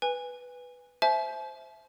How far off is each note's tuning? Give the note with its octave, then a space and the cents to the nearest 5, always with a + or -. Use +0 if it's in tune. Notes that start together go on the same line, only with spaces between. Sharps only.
B4 +0 G#5 -20
C5 +0 E5 +0 A5 -45